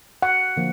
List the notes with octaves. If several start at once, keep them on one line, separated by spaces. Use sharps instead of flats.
F#5
D3 F3 A#3